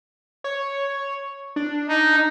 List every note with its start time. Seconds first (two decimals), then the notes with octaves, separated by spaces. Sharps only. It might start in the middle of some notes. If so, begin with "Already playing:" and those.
0.44 C#5
1.56 D4
1.88 D#4